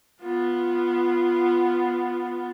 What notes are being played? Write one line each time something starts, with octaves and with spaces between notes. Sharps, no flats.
B3 F4